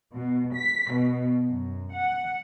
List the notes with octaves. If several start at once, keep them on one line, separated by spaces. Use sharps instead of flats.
B2
B6
B2
F#2
F#5